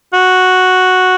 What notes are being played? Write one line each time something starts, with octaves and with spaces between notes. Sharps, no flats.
F#4